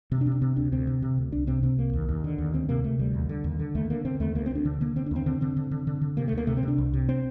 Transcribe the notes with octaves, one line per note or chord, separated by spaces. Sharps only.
C3 C4
D4
C3
D4
C3 C4
D2 D4
D2 C4
C3
C3
D2
C2 D4
C3 C4
C3 C4
C2 A#3
D#2
D#2
D3
D#2
D2 C4
C3 A#3
C3 A3
D2 G3
D#2
D3
D#2
D3
D#2 A3
D3 A#3
D3 C4
D#2 A3
D2 A#3
C4
D2 D4
D3
D3 A#3
D3 C4
D4
D#2 C4
D3 C4
D3 C4
D3
D3
D3
D3
C3 A#3
A3
D2
A#3
C3 A3
C4
C3 D4
C2
C3
C4